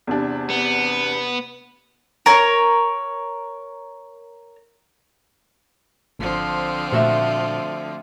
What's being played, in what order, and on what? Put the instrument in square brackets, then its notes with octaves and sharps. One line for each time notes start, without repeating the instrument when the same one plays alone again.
[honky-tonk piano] E2 C3 D4
[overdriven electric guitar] B3
[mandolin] A#4 C#5
[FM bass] G#1 [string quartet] D3 F3 C4
[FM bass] A#2 [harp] A3 F#4 E5